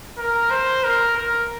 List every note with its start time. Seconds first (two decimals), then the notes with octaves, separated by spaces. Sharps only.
0.18 A#4
0.50 C5
0.84 A#4
1.17 A#4